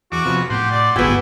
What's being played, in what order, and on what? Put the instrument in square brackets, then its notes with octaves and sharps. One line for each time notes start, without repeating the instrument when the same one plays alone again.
[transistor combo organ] E2 D6 [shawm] F#4
[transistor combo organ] C3 F3 B3
[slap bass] A2 [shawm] G4 [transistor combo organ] F#5 C6
[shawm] D5
[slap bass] G1 D2 G#2 [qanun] B3 G5 [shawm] E4 [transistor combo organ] F#4 G#4